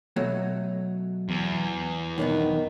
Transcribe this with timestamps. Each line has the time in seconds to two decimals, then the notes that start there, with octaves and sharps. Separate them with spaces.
0.16 B2 F#3 A3
1.29 E2
2.18 B1 G2 D#3 B3